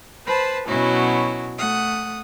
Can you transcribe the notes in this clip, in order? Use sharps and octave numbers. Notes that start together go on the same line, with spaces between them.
B4 C5 A5 B5
B2 F#3 C#4 E4 F#4
A3 F#5 D#6